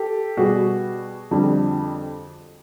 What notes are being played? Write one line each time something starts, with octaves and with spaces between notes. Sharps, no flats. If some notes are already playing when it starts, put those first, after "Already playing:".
Already playing: G4 A4
B2 G3 F#4 G#4
F2 D3 G3